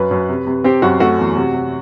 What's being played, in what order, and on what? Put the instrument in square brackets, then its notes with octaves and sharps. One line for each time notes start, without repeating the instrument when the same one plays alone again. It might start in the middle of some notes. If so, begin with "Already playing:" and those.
Already playing: [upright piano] F#2 B4
F#2
C3
C3
C4 G4
F#2 F#4
A3 F#4
E2
C3
C3